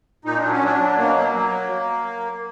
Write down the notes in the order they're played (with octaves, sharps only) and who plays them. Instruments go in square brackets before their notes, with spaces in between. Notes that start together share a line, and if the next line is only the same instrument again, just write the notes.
[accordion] A#2 D#4
D4
F#3
C#4
F#3 D4
F#3
B2 A#3
F#3
F#3